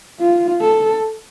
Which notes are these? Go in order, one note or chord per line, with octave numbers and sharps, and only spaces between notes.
F4
A4